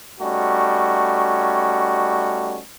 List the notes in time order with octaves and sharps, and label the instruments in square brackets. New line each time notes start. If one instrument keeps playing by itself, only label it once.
[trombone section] G3 A3 C#4 D#4 F#4